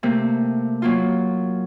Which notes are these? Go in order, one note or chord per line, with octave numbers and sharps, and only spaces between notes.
C3 A3 A#3
F#3 A#3 F4